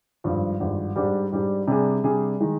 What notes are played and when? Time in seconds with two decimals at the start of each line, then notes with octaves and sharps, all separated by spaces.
0.24 G#1 G2 F3
0.60 G#1 G2 F3
0.96 G#2 G3 D4 G4
1.32 G#2 G3 D4 G4
1.67 C3 G3 D4 G#4 D5
2.04 C3 G3 D4 G#4 D5
2.40 D#3 G#3 D#4